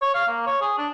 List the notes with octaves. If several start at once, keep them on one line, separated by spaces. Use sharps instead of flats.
C#5
F5
A#3
C#5
G#4
D4